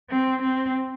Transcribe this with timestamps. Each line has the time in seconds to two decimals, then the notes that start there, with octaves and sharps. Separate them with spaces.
0.10 C4
0.42 C4